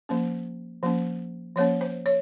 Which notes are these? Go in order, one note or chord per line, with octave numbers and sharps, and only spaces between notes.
F3 A#3 C#4
F3 A#3 C#4
F3 A#3 C#4 C#5
C5
C#5